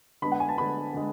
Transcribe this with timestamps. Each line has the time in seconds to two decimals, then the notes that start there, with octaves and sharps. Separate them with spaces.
0.22 D3 G#3 B3 D4 B5
0.32 F#5
0.40 G#5
0.49 A5
0.58 D3 G#3 B3 D4 B5
0.94 D3 G#3